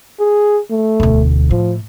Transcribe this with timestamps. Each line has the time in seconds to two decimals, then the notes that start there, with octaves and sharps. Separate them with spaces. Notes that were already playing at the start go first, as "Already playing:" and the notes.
0.20 G#4
0.71 A3
1.00 E1 D2
1.51 A2 F3